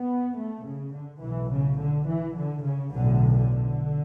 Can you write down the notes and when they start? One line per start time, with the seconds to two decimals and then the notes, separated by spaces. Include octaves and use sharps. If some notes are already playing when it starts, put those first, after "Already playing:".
Already playing: B3
0.37 A3
0.65 C#3
0.93 D3
1.22 B1 A2 E3
1.51 C#3
1.79 D3
2.07 E3
2.36 D3
2.64 C#3
2.93 B1 A2 D3
3.35 D3